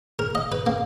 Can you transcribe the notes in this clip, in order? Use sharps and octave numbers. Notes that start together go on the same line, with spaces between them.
A#4
D#5
B4
A#3